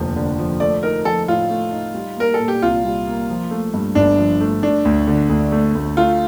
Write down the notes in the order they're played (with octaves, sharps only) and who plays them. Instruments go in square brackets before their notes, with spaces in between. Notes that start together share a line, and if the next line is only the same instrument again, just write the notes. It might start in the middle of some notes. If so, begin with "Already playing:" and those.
Already playing: [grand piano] F1 D#2 D3 F3
D3
F3
[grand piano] A3 [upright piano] D5
[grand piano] D#4 [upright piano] A#4
[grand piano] F3 [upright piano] A4
[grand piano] A2 [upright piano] F4
[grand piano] A3
D#4
G3
[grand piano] A#3 [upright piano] A#4
[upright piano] A4
[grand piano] A#2
[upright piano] G4
[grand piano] C2 [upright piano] F4
[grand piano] G3
A#3
F3
A3
G2
[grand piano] G1 [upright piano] D4
[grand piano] F3
A3
[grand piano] A3 [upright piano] D4
[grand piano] D2
D3
D2
A3
D2
[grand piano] A3 [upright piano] F4